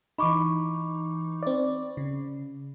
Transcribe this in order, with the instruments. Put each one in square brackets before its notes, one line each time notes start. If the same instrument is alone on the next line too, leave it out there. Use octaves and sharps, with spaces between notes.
[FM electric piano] E3 D#4 [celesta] B5 C#6 D6
[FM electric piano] C4 D5
C#3